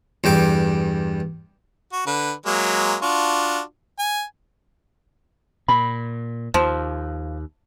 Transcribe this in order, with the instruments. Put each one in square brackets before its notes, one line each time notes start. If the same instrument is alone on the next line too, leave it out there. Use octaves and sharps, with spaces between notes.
[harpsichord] E2 G2 G5 D6
[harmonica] F#4
D3 B4
F#3 G#3 A#3
D4 F4 F#4
G#5
[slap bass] A#2 [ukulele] B5
[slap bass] D#2 [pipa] F3